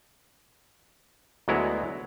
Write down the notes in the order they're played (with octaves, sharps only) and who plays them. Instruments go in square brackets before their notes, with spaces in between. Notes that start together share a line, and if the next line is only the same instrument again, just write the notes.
[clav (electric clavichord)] D2 F#3 G#3 B3 E4 A#5